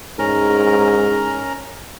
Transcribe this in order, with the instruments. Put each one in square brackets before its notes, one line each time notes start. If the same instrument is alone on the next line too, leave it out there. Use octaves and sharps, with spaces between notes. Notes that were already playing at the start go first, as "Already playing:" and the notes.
[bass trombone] G#2 [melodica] C#4 A#4 A#5